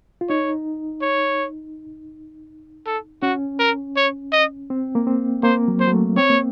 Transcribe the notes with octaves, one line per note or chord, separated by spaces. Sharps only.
F4
D#4 C#5
C#5
A4
C#4 F#4
A#4
C#5
D#5
C4
A#3
C4
A#3 C5
F#3
C5
F#3
A3
C4 C#5
A#3